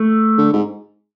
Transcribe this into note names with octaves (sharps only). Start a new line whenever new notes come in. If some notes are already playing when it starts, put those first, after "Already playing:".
Already playing: A3
D3
G#2